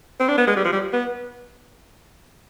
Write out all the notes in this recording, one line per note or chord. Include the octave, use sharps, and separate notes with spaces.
C4
D4
B3
G#3
G3
F3
G3
B3